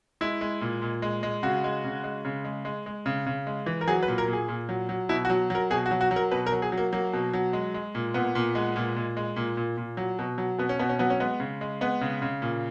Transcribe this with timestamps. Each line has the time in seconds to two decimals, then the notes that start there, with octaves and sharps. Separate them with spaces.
0.21 G#3 E4
0.41 G#3
0.61 A#2
0.82 A#2
1.02 G#3
1.23 G#3
1.43 C#3 F#4
1.64 G#3
1.84 C#3
2.04 G#3
2.25 C#3
2.44 G#3
2.65 G#3
2.86 G#3
3.06 C#3
3.26 C#3
3.47 G#3
3.66 E3
3.81 A#4
3.88 F#3 G#4
4.03 B4
4.08 A#2
4.18 A#4
4.28 A#2
4.33 G#4
4.48 A#2
4.69 F#3
4.89 F#3
5.09 B2 E4
5.25 F#4
5.30 F#3
5.50 F#3 A#4
5.70 B2 G#4
5.86 F#4
5.91 F#3
6.01 F#4
6.11 F#3
6.16 A#4
6.31 B2 B4
6.46 A#4
6.52 F#3
6.62 G#4
6.72 F#3
6.77 A#3
6.92 F#3 A#3
7.13 B2
7.33 F#3
7.53 G#3
7.74 G#3
7.95 A#2
8.14 A#2 B3
8.35 A#2
8.55 G#3
8.76 A#2
8.96 A#2
9.17 G#3
9.36 A#2
9.57 A#2
9.77 A#2
9.97 F#3
10.19 B2
10.38 F#3
10.58 B2 B3
10.69 C#4
10.79 B2 B3
10.89 C#4
10.99 F#3 B3
11.10 C#4
11.20 G#3 B3
11.40 C#3
11.61 G#3
11.81 G#3 B3
12.01 C#3
12.22 C#3
12.42 A#2